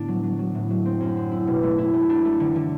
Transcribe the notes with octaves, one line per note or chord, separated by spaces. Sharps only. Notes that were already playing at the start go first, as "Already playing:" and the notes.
Already playing: A2 D3 B3 D4
F#3
F#3
F#3
A2
F#3
C4
F#2
C4
E4
B2
A3
E4
A3
D4
A3
D3
D3